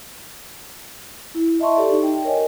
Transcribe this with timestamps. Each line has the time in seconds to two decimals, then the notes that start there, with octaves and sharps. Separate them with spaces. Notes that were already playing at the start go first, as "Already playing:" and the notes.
1.35 E4
1.60 D#5 E5 A5 C6 C#6
1.76 G4 A4 D5
1.91 D#4
2.03 G5
2.24 A#4 C#5 D#5 G#5